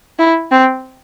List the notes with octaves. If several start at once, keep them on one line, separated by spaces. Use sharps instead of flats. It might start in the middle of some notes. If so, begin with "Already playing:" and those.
E4
C4